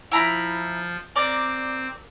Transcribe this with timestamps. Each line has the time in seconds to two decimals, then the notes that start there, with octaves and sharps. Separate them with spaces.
0.12 F3 E4 A#5 B5
1.16 C4 A#4 D5